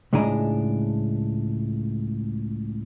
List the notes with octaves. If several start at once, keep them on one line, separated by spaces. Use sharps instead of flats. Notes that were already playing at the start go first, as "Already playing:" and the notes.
C#2 A2 G#3 D4 G#5 A#5